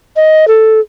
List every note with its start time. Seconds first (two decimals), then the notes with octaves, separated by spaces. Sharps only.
0.16 D#5
0.48 A4